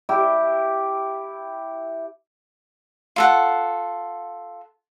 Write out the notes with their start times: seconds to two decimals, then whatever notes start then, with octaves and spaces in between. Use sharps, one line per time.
0.09 E4 G4
3.16 F4 A4 F#5